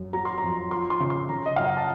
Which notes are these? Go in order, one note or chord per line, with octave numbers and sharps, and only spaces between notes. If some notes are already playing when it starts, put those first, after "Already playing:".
Already playing: F#2
F#3 A#5
C6
F2 A#5
F3 C6
C6
C#3
C6
C#3 A#5
D#5
F#2 F5
F#5
A5